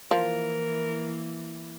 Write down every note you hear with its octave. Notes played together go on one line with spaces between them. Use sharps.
E3 F3 A#3 E4 A#4